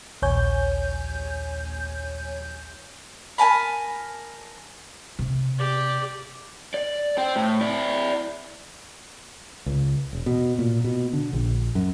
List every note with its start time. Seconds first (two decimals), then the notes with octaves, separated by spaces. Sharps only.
0.22 A#1 D#2 C#5 G#5 G6
3.38 A#4 G#5 A5 B5
5.19 C3
5.58 G4 D5
6.74 D5
7.18 C5 G5
7.36 A2
7.61 E4 D5
9.66 C#2
10.13 E1
10.26 B2
10.59 A#2
10.84 B2
11.13 D3
11.33 A#1
11.75 F#2